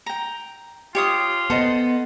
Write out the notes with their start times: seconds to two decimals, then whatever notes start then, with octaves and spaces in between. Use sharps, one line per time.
0.06 G5 A#5
0.95 F4 G4 C#5 D#6
1.50 B3 A4 C5 D#5